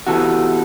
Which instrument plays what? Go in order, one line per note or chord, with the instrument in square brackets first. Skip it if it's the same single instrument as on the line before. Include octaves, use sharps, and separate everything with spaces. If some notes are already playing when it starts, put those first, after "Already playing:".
[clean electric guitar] E2 C3 E3 F#4 A4